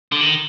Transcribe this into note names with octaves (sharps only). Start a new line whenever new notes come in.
D3
D#3